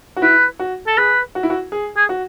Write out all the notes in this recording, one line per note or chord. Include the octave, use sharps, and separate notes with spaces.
F#4
E4 B4
F#4
A4
G#4 B4
F#4
E4
F#4
G#4
G#4
F#4